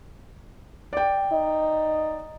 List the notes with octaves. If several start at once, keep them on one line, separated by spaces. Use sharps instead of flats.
D5 G5
D#4